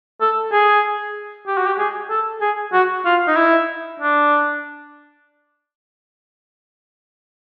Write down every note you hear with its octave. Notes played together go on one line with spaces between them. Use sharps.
A4
G#4
G4
F#4
G4
G#4
A4
G#4
F#4
F4
D#4
E4
D4